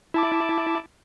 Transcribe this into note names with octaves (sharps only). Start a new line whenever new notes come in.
E4 A5 D6